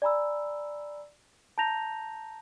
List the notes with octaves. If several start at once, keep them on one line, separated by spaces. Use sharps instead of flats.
D5 G#5 A#5 B5 E6
A5 A#5 G6 A#6 F7